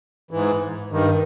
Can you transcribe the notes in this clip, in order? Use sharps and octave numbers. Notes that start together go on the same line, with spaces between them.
G#2 E3
G2 D#3